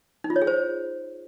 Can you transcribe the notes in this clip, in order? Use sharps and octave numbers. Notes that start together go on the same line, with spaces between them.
D#4
F4
C#5
G#4
C5